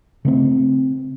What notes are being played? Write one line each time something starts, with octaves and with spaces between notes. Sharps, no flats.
C#3 A3 C4